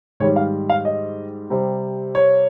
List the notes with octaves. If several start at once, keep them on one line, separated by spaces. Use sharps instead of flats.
G#2 D#3 G3 C#5
F5
F5
D#5
C3 G3 C4
C#5